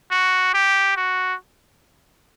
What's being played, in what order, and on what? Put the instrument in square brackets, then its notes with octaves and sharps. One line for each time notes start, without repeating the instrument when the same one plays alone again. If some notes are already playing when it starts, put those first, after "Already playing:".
[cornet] F#4
G4
F#4